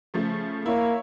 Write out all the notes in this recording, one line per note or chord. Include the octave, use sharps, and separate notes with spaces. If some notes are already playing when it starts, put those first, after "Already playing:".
C#3 F3 A3
A#3 E4 C#5